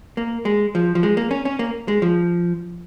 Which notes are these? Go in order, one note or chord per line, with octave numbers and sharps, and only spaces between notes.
A#3
G#3
F3
F3
G#3
A#3
C#4
C#4
A#3
G#3
F3